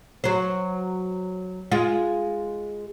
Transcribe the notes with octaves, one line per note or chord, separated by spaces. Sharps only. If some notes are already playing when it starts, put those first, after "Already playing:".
F#3 C5
G#3 F4